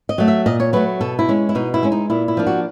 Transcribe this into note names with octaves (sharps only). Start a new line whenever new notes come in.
D#5
F#3 A3
E5
A#2 D#5
C#5
F#3 A3 B4
B2 A4
E4
G#3 C#4
E4
B2 D#4
E4
G#3 C#4
D#4
A#2 E4
E4
F3 A#3 D4
F#4